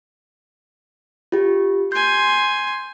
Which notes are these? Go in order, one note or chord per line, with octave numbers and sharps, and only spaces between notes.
F4 G4
G#5 C6 G6